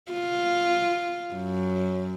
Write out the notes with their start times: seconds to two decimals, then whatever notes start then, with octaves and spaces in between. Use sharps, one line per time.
0.12 F4
1.34 F#2